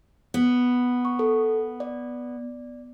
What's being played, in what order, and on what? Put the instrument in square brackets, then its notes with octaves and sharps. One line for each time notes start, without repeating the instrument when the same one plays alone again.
[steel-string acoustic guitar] B3
[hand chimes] C#6
A4
D5